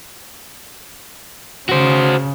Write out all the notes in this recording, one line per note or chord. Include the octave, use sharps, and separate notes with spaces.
C#3 F#4 C5